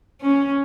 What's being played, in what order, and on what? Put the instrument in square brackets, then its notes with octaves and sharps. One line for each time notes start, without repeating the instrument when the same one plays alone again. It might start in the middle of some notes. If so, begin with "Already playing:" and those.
[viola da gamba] C#4